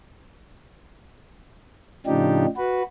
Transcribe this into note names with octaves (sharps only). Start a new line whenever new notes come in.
A2 C#3 F3 D4 D#4 G4
F#4 B4